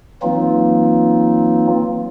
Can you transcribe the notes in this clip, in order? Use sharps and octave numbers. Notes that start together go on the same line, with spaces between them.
E3 F#3 A#3 C4 D#4 F4